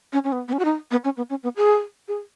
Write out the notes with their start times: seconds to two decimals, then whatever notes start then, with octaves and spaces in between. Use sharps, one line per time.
0.13 C#4
0.24 C#4
0.32 B3
0.48 B3
0.53 C#4
0.59 F#4
0.65 D#4
0.91 B3
1.05 C#4
1.17 B3
1.30 C#4
1.43 B3
1.56 G#4
2.08 G#4